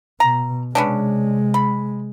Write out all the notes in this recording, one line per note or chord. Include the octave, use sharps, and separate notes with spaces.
B2 A#5
C3 G#3 B3 C#4 D4
B5